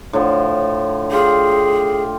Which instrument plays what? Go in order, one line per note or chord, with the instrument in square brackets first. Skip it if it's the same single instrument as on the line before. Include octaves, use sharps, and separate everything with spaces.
[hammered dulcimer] A2 D3 F3
[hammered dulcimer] F4 G4 [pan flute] G#4